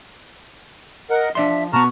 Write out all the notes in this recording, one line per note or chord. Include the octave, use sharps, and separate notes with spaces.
A#4 D#5 F#5
F3 D4 D5 E5 C6
B2 B3 A5 A#5 C#6 F6